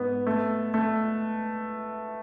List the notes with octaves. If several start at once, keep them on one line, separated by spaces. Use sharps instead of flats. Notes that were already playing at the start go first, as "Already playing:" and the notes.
Already playing: G#2 B3
A3
A3